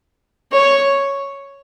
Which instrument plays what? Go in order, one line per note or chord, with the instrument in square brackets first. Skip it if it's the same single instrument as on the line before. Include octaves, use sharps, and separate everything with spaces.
[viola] C#5